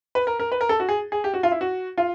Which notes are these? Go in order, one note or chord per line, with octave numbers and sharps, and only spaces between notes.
B4
A#4
A#4
B4
A#4
A4
F#4
G#4
G#4
G4
F#4
F4
E4
F#4
F4